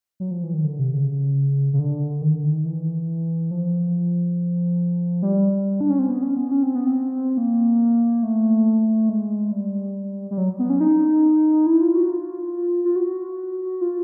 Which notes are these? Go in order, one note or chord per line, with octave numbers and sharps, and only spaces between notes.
F#3
F3
E3
D#3
D3
C3
C#3
C#3
D3
D#3
D3
D#3
E3
F3
G3
D4
C#4
C4
B3
C#4
B3
C#4
C4
B3
C4
A#3
A3
G#3
G3
G3
F#3
B3
C#4
D#4
E4
F4
F#4
F4
F4
F#4
F4